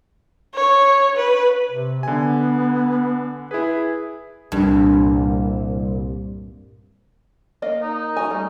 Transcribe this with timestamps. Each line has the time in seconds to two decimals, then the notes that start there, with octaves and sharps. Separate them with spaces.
0.55 C#5
1.16 B4
1.71 C3
2.03 D3 B3 G#5
3.51 E4 G#4 B4
4.52 C2 G2 A#2
7.62 A#3 D#5 F5
7.82 D#4
8.17 F#4 G#5
8.30 G3 A3